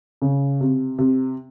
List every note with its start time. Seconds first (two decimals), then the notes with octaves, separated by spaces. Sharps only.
0.22 C#3
0.61 C3
0.98 C3